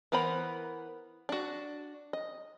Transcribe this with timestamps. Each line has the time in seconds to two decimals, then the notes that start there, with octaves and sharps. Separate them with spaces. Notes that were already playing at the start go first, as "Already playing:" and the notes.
0.12 E3 B3 A#4 C5 B5
1.29 D4 F#4
2.13 D#5